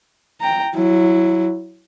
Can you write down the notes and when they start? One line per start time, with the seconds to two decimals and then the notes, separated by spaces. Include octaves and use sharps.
0.41 G5 A#5
0.75 F#3 E4